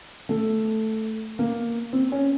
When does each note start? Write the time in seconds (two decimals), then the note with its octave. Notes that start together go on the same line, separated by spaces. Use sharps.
0.29 A3
1.39 A#3
1.93 C4
2.12 C#4